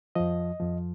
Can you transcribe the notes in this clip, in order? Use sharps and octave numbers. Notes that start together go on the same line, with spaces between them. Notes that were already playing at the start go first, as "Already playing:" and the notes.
F2 F3 D#5
F2 F3